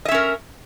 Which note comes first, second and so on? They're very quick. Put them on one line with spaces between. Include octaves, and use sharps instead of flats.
D#5 E5 C#4 A#4